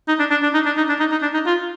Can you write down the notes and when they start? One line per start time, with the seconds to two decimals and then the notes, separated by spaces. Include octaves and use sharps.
0.08 D#4
0.19 D4
0.31 D4
0.43 D4
0.54 D#4
0.66 D4
0.77 D#4
0.89 D4
1.00 D#4
1.11 D#4
1.22 D4
1.34 D#4
1.46 F4